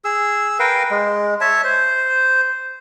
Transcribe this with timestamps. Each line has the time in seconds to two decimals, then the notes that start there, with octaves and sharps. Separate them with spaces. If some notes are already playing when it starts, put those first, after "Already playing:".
0.05 G#4 E6
0.59 A#4 B4 F5 G5
0.91 G#3
1.41 C#5 E5 A5
1.64 C5